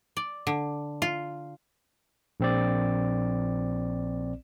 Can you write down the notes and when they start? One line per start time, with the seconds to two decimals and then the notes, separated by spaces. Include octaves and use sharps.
0.17 D5
0.47 D3
1.02 F4
2.40 A#1 C4 D5